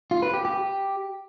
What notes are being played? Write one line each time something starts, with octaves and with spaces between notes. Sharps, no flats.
F4
B4
G4
G4